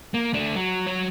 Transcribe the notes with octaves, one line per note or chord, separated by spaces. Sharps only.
A#3
A3 D4
F#3
F#3 C#5